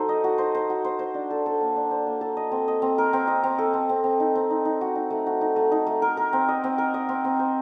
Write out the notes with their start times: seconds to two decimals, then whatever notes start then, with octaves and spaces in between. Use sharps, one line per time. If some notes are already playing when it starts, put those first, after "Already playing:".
Already playing: F#3 D#4 A4 C5
0.09 D#5
0.24 F#4
0.38 C5
0.55 C5
0.70 F#4
0.85 C5
0.99 C5
1.14 D4
1.30 A4
1.46 A4
1.61 A#3
1.76 D4
1.91 C5
2.07 A#3
2.21 A4
2.37 D#5
2.52 C4
2.68 D#5
2.82 C4
2.98 A#4
3.13 C4
3.28 D#5
3.44 C4
3.59 A4
3.74 C4
3.89 C4
4.04 C4
4.20 D#4
4.35 C4
4.50 D#4
4.65 D#4
4.81 F#4
4.95 D#4
5.10 A3
5.27 F#4
5.41 D#4
5.56 A3
5.72 D#4
5.87 A3
6.02 A#4
6.17 A#4
6.33 C4
6.49 D#5
6.64 C4
6.78 A#4
6.94 D#5
7.09 C4
7.25 C4
7.39 C5